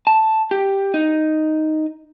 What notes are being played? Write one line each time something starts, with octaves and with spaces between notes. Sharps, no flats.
A5
G4
D#4